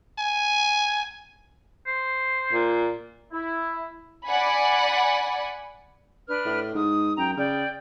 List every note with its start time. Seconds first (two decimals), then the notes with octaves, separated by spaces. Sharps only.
0.19 G#5
1.87 C5
2.53 A#2
3.32 E4
4.26 D5 F#5 G#5 B5
6.28 D4 B4 F6
6.45 A2
6.75 G#2 D#6
7.17 F#2 G5 A#5
7.37 C#3 D5 G5